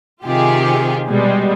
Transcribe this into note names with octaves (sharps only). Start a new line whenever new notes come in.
C3 D#3 F4 G4 G#4
B2 G3 G#3